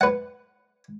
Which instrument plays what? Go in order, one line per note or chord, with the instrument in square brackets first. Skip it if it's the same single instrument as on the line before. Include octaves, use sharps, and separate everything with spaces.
[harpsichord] B4 F#5